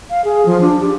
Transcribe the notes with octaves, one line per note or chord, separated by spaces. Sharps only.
F5
G#4
F3
D4
G4